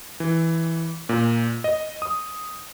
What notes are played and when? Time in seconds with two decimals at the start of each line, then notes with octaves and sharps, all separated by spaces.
0.20 E3
1.09 A#2
1.64 D#5
2.02 D#6